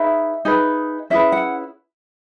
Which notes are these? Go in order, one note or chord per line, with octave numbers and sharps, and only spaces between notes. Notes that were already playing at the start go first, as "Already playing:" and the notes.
Already playing: D#4 G#4 B4 E5
D#4 G#4 B4
C#4 E4 G#4 B4 E5
F#5